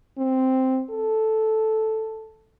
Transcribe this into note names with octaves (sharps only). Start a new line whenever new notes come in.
C4
A4